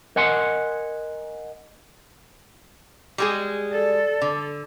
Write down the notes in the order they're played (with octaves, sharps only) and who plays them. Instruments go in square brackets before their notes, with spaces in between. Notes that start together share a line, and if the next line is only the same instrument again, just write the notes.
[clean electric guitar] A#4 D#5 F#5 G#5 C6
[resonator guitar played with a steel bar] G3 G#3 G#4
[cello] A4 [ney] D5
[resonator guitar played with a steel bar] D3